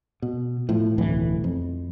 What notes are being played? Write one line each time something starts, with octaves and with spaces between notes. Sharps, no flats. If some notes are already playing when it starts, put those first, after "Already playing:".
B2
A2 F3
D1 B1 A2 E3
F2